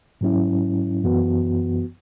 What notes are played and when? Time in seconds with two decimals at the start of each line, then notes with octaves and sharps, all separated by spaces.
0.21 G#2 F#3 C#4 E4
1.04 F#2 E3 B3 F#4